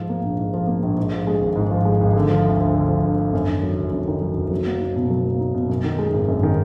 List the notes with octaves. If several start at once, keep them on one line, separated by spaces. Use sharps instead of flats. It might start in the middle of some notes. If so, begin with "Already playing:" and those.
Already playing: G#2 F3
A#3
A#1
G#2
F3
A#3
A#1
G#2
F3
G#3
G#1
G#2
F3
G#3
G#1
D3
F3
D2
D2
D3
F3
D2
D2
F#2
D#3
F#3
F#1
F#2
D#3
F#3
F#1
F#3
A#3
D#4
B2
F#3
A#3
D#4
B2
F#2
D#3
G#3
G#1
F#2
D#3